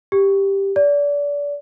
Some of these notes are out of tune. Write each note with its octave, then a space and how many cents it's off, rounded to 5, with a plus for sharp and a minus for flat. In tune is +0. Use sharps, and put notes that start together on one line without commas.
G4 +5
D5 -30